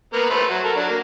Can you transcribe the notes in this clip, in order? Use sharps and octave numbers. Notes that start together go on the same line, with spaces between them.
A#3 B3 A#4
A3 B4 C5
F#3
A4 A#4
F#3 D4
A#3